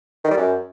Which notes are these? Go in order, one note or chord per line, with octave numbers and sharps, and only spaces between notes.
D#3
G3
F#2